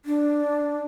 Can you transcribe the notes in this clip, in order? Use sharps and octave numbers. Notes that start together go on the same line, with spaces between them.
D4